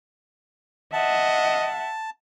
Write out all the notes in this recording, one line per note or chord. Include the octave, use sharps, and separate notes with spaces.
D#5 E5 F#5 A5